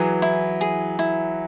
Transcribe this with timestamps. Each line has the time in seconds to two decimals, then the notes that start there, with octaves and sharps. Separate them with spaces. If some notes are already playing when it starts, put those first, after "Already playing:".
Already playing: E3 F#3 G#4
0.22 E4
0.61 G#4
0.99 E4